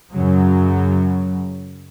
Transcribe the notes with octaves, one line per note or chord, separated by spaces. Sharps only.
F#2 C#3 F#3